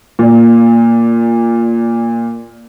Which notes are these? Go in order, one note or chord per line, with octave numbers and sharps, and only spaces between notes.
A#2 D5